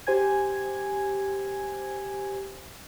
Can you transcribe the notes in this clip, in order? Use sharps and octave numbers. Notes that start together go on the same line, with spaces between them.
G4 C5 G#5 G#6